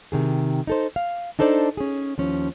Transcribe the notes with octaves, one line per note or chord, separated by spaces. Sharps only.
C3 D#3 G#4
D#4 A4 C5
F5
D4 D#4 A4 C5 D5
C#4 G#4
D#2 F3 C#4